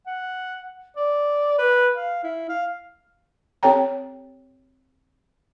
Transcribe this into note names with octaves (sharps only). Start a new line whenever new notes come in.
F#5
D5
B4
F5
E4
F5
C4 G4 A4 C#5 G5 A#5